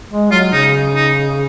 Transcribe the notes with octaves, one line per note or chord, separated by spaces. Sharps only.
G#3
F#3 F4
C#3 D#4
D#4